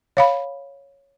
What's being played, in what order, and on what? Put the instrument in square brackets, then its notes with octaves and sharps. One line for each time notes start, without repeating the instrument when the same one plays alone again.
[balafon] C#5 F5 B5